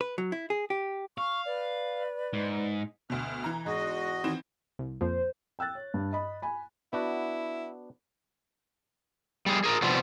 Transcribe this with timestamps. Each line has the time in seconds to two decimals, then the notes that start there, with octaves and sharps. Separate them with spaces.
0.01 B4
0.18 F#3
0.32 E4
0.50 G#4
0.70 G4
1.18 F5 C#6
1.46 B4 D5
2.33 G#2
3.10 D2 B2 F6
3.44 E3 A#5
3.66 E2 G#2 G#3 F#4 D#5
4.24 D#3 E3 C4
4.79 C2
5.01 F2 A#2 F3 C5
5.59 G5 E6 F#6 A6
5.75 C#5
5.94 G2
6.13 D#5 B5
6.42 G#5 B5
6.93 B3 D4 E4 F#4
9.46 G3 G#4
9.64 G#4 A#4
9.82 C3 F3 G3 B3 C4